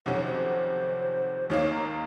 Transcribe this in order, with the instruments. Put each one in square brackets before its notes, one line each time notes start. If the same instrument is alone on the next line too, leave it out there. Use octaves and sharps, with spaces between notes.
[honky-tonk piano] F2 C3 D#3 F#3 C#4 [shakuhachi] C5
[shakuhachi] C#5
C5
[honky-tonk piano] D#2 D#3 A#3 [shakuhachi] C#5
[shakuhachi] A#5